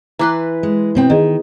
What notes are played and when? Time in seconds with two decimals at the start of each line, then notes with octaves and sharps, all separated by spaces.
0.19 E3 B4 A#5 C6 D6 F#6
0.63 G#3
0.95 B2 C4 G5
1.10 D#3 G#4 D#5